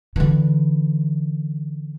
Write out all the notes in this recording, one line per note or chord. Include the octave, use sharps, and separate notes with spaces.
D3 E3